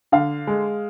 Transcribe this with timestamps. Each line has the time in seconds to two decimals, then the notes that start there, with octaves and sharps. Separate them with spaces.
0.12 D3 F5
0.47 G#3